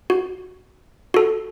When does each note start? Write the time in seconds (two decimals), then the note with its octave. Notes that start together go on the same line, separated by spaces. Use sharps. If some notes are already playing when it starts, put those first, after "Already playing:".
0.10 F#4
1.14 F#4 A4